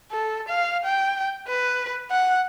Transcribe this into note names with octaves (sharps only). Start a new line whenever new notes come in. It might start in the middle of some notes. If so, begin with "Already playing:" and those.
A4
F5
G5
B4
F#5